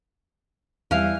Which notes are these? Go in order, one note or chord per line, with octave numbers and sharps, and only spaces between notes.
E2 E3 G3 F5